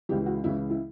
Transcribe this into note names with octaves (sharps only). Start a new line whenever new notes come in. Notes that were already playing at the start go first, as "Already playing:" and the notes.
C#2 C#3 E3 G4
F#4
C#2 C#3 E3 E4
E4